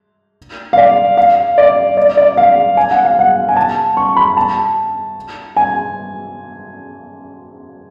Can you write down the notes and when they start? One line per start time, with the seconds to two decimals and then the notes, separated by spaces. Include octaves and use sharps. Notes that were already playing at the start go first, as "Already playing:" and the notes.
0.73 F5
0.77 D5
1.17 F5
1.58 D5
1.97 D5
2.17 D5
2.37 F5
2.77 G#5
2.91 F#5
3.05 F5
3.19 F#5
3.49 G#5
3.56 A5
3.97 C#6
4.17 B5
4.37 A5
5.56 G#5